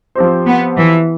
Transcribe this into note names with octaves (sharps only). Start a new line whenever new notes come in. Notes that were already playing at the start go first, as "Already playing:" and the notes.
F3 C4 G4 C5
B3
E3